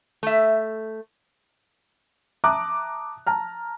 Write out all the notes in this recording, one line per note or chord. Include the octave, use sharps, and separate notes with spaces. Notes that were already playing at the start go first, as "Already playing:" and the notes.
A3 E5
E5 A5 A#5 D6 D#6 F#6
A5 A#5 F6